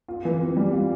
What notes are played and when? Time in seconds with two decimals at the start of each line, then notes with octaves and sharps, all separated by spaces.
0.08 F4
0.25 E3
0.41 C4
0.57 G3
0.73 F4